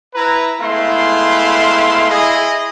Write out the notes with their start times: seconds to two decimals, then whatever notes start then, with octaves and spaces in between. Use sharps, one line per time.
0.14 E4 B4 A#5
0.61 G#3 A3 B3 E4 F5 C6
2.10 E4 G#4 D#5